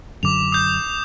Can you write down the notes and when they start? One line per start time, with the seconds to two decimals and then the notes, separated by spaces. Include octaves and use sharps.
0.23 F#2 D3 F#3 D6 F7
0.52 D#6 G6